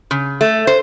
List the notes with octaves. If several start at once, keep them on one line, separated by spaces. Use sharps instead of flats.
C#3
A3
C5